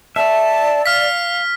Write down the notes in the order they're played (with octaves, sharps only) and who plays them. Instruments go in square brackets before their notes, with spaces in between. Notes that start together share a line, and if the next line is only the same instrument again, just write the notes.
[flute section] D5 [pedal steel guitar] E5 [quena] A5
[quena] F5 [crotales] F6 B6